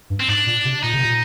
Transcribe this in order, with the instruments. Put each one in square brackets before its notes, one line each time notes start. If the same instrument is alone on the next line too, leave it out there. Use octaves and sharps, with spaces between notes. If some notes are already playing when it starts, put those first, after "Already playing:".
[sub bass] G2
[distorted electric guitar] C4
[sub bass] G#2 [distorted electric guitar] D4
[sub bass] A#2
C3
[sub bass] A#2 [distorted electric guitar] D#4
[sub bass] C3
A#2